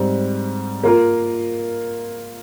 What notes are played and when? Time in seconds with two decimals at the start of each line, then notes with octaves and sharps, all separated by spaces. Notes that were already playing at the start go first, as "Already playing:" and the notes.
Already playing: G#2 G3 C4
0.83 A#3 F4 A#4